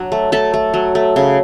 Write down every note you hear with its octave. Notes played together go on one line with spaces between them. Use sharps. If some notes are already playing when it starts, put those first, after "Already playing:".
Already playing: F#3 D4 F#4
A3
A3 A4 A5
A3
F#3
A3
C#3